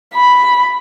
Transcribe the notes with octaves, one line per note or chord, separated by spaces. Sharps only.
B5